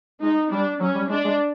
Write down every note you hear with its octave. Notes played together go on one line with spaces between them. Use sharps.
G#3 D#4
G3 D4
F#3 C#4
G3
G#3 D4
G#3